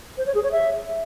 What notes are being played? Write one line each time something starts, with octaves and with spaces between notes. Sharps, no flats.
C5
C#5
G#4
C#5
E5